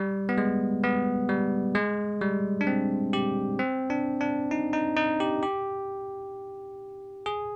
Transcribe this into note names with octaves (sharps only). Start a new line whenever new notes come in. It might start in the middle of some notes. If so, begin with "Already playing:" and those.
Already playing: G3
B3
G#3
B3
G3
G#3
G3
D4
C4
G4
C4
D4
D4
D#4
D#4
D#4
G4
G4
G#4